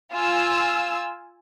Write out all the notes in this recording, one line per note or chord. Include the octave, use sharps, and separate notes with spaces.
F4 G#5 E6